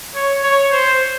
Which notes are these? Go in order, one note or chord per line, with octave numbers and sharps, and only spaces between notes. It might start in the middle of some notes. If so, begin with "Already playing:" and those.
C#5
C#5
C5